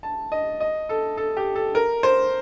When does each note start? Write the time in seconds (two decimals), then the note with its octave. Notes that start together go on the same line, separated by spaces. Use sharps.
0.03 A5
0.32 D#5
0.60 D#5
0.89 A4
1.17 A4
1.37 G4
1.55 A4
1.75 A#4
2.03 C5